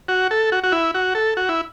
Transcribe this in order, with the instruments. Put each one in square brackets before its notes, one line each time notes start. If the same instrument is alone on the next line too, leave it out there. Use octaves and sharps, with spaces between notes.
[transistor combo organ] F#4
A4
F#4
F#4
E4
F#4
A4
F#4
E4